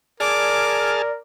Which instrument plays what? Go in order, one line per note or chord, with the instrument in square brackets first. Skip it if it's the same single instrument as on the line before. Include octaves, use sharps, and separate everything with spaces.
[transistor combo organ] G#4 A5 F6 [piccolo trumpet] A#4 [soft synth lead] D5 [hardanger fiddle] D6